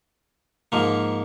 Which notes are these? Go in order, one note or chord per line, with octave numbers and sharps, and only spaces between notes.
G#2 F3 A#3